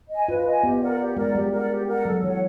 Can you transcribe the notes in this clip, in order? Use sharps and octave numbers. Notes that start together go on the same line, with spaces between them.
D#5
G#5
F4 B4
D#5 G#5
B3 G4
A#4 D5 F#5
G4
G#3 A#4 D5 F#5
G3 G4
A#4 D5 F#5
G4
A#4 D5 F#5
F#3 A4
E3 C#5 F#5